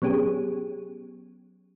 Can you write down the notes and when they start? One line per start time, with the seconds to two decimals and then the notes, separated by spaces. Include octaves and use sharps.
0.02 F#3 B3 C#4 G4 G#4